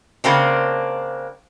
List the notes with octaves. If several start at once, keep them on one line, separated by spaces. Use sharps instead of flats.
C#3 A#3 C4 D4